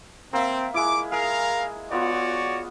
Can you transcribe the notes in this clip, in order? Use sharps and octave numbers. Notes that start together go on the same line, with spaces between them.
A#3 C4 E5
G#3 E4 D6
G#4 A#4 F5
B3 F4 F#4 C#5 D5 F#5